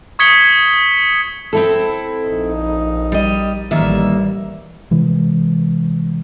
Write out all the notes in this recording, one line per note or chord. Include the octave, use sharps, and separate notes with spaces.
C#6 D#6 G#6 B6 C#7 G7
C4 E4 A4
A#1 D#4
G3 D#5
A1 D#3 G3 A#3 E5
C3 E3 G#3